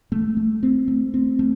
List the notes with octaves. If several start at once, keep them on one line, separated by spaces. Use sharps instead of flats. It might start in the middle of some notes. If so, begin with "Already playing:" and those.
A3
A3
C4
A3
C4
A3